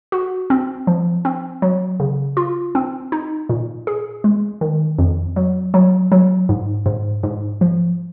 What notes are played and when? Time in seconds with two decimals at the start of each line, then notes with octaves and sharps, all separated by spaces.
0.12 F#4
0.50 C4
0.87 F3
1.25 C4
1.62 F#3
2.00 C#3
2.37 F4
2.75 C4
3.12 D#4
3.49 A#2
3.87 G#4
4.24 G#3
4.61 D#3
4.99 F2
5.36 F#3
5.74 F#3
6.12 F#3
6.49 G#2
6.86 G#2
7.23 G#2
7.61 F3